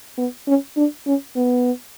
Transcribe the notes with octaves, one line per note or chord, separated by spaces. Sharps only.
B3
C#4
D4
C#4
B3